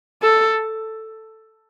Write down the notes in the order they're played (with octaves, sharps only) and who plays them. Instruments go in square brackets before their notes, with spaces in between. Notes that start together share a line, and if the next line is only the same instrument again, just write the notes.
[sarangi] A4